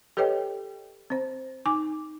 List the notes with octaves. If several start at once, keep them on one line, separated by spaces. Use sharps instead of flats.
G4 A4 B4 C#5 D#5 G5
C4 C5
D#4 G#5 D6